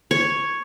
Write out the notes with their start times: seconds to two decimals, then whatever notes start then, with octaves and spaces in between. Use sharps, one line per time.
0.11 C#5